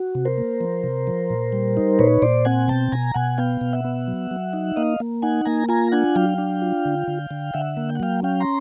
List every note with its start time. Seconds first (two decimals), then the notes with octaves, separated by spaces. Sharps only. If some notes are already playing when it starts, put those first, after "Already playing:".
Already playing: F#4
0.15 C3
0.25 A#4 C5
0.38 A#3
0.61 F3
0.84 C3
1.07 F3
1.30 A#2
1.52 G3
1.77 D#4
1.99 A#2 B4 C#5
2.22 A#2 C5 D5
2.45 C4 F#5 G#5
2.68 B2 G5 A5
2.92 B2 G#5 A#5
3.14 B2 F#5 G#5
3.38 B3 F5 G5
3.61 B2
3.73 E5 F#5
3.85 B3
4.08 F#3
4.31 F#3
4.53 D#4
4.76 A#3 D#5 F5
5.00 A#3
5.22 D#4 F#5 G#5
5.45 A#3 G#5 A#5
5.69 F4 G#5 A#5
5.92 D4 F#5 G#5
6.15 F#3 F5 G5
6.38 D4
6.62 F4
6.85 D3
7.08 D3
7.31 D3
7.54 D3 E5 F#5
7.77 A#3
7.89 G5
7.95 F#5
8.00 F#3 F5 G5
8.23 C#4 F5 G5
8.40 A#5 C6